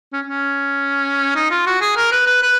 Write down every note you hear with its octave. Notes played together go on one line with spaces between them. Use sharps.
C#4
C#4
D#4
F4
F#4
G#4
A#4
B4
B4
B4